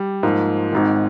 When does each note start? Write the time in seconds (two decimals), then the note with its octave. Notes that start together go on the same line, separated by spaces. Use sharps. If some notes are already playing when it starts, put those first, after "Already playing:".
Already playing: G3
0.23 G#2 F3 A#3
0.73 G#1 G#2 D#3